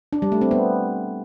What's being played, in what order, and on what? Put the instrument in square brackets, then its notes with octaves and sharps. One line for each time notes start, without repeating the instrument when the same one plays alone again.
[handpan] D4
G3
A3
C4
B3